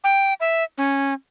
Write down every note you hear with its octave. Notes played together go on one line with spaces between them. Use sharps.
G5
E5
C#4